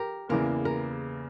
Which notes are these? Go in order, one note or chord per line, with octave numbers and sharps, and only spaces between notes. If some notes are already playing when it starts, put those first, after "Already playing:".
Already playing: G4 A#4
E2 C#3 E3 A#3 A#4
A#4